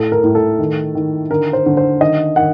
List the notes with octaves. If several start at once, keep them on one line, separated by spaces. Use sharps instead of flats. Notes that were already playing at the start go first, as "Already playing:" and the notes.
Already playing: A2 A4
A#4
A2
A4
D#3
D#3
D3 A#4
C5
D3
C5
D#3 D#5
D#3 F#5